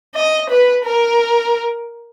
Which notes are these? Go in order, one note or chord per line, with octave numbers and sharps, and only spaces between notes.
D#5
B4
A#4